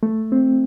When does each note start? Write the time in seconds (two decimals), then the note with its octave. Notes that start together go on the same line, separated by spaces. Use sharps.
0.03 A3
0.32 C4